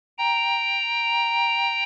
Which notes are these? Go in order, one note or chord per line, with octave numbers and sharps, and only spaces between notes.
G5 A#5